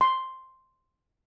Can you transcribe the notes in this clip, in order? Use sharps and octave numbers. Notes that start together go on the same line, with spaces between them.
C6